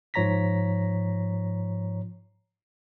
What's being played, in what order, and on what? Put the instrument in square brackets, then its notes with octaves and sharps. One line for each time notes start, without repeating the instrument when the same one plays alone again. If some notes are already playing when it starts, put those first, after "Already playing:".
[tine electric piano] G#2 F3 C#5 A#5 A#6 B6